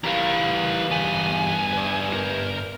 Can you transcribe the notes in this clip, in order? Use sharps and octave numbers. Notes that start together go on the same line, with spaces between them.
E2 E4 G4 A#4 B4 F5 A#5
G2 B3 G#5
B4 D5
A#4